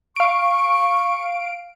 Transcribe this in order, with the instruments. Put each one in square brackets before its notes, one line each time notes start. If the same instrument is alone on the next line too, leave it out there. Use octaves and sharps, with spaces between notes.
[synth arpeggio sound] F5 D7 [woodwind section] C#6